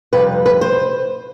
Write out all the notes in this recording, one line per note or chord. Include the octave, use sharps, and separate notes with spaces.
F2 C3 G3 B4
B4
C5